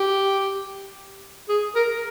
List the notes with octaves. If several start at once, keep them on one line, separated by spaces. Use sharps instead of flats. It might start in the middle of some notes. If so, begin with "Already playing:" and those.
Already playing: G4
G#4
A#4